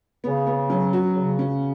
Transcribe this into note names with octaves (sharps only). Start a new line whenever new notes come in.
C#3 B3
B3
F#3 C#4
F#4
C#3
C#4